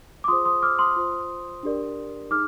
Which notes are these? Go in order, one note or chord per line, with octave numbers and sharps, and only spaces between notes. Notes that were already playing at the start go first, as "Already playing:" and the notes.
D6
F4 G#4 C5 C6 D#6
C6 D#6
D6 F6
C6 D#6
F4 C5
D4 G4 A#4 D5
D#4 G#4 D6 F6